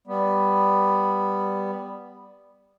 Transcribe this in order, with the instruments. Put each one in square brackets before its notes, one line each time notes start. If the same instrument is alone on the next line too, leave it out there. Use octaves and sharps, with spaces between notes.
[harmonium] G3 B3